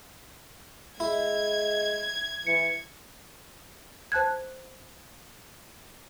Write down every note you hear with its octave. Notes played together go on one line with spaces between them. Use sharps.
G#3 E4 G#6
E3 C#7
C5 A5 F#6 G#6